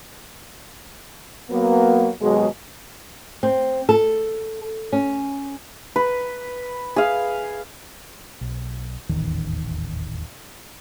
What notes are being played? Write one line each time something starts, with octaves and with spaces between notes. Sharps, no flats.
F#3 A#3 B3
D#2 B2 F#3 G#3
C4
A4
C#4
B4
G#4 F5
B1
D#1 A1 E2 D#3